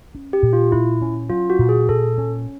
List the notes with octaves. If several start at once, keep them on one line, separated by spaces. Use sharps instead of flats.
C#4
G4
A#2
F4
A#2 E4
C#4
F#3 F4
F#4
A#2
G#4
A#2 A4
C#4